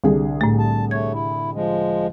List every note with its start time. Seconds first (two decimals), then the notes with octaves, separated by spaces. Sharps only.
0.04 C2 D3 G#4
0.41 A2 A3
0.59 A5
0.91 A3 C#5 G#6
1.13 E4
1.54 F3 G#3